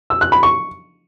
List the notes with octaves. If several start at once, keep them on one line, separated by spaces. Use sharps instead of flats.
E6
F#6
B5
C#6